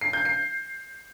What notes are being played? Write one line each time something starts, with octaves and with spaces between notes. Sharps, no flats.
C7
G6
C7